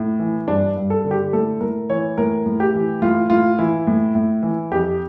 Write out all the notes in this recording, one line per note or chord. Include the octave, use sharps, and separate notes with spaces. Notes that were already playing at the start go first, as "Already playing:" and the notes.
Already playing: A2
E3
G2 D4
G2
A4
D3
G4
A2 A4
A2 A#4
E3 C#5
A2 A#4
A2
G4
E3
A2 F4
A2 F4
E3 E4
A2
A2
E3
F2 G4